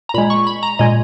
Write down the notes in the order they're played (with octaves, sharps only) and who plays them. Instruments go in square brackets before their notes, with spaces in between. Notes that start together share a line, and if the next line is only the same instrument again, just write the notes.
[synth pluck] A#5
A#2 G#3 B5
C#6
B5
A#5
A#2 G#3 D#5